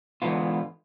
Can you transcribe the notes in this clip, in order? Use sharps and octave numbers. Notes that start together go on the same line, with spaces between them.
G#2 D3 E3 B3 F4